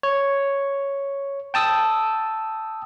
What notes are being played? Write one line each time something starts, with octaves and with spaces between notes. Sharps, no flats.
C#5
G5 A5 D#6 E6